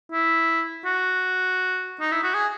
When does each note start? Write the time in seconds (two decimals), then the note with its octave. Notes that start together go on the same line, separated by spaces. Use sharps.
0.12 E4
0.85 F#4
2.01 D#4
2.12 E4
2.23 F#4
2.34 G#4